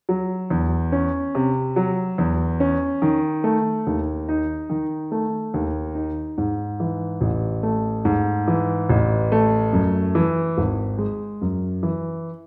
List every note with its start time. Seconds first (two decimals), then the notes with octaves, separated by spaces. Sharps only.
0.09 F#3
0.50 E2
0.92 C#4
1.35 C3
1.76 F#3
2.18 E2
2.60 C#4
3.02 D#3
3.44 A3
3.87 D#2
4.29 D#4
4.70 D#3
5.12 A3
5.54 D#2
5.95 D#4
6.38 G#2
6.80 E3
7.21 A1
7.63 A3
8.05 G#2
8.48 E3
8.90 A1
9.32 A3
9.73 F#2
10.15 E3
10.58 G#1
10.98 G#3
11.41 F#2
11.83 E3